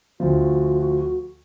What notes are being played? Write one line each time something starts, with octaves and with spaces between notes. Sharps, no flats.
D2 F3 F#4